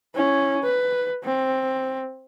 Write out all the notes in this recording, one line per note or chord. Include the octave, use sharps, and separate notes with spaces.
C#4 E4
B4
C4